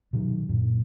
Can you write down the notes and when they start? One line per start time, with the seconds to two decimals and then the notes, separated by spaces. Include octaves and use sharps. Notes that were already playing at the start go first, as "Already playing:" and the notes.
0.13 B2 D#3 F#3
0.49 F#2 A#2